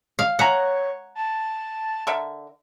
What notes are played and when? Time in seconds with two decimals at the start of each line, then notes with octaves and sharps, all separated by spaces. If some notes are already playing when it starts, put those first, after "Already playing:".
0.19 F5
0.39 C#5 E5 F#5 G#5 A#5
1.15 A5
2.07 D3 A#4 E5